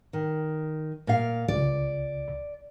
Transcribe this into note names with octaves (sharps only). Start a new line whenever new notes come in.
D#3
A#2 F5
C#2 D5